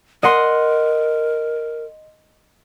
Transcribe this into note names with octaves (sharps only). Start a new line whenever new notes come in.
A#4 D#5 F#5 C6